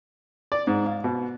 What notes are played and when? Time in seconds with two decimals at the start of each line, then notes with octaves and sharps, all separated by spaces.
0.52 D5
0.67 G#2
0.86 F5
1.04 B2